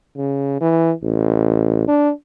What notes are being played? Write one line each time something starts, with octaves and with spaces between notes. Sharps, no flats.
C#3
E3
A1
D4